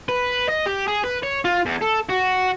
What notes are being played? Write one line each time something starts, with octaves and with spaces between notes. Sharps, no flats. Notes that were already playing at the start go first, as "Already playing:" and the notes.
B4
D#5
G4
G#4
B4
C#5
F4
E2
A4
F#4